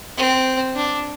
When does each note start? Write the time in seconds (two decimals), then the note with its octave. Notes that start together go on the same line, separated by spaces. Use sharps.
0.17 C4
0.76 D4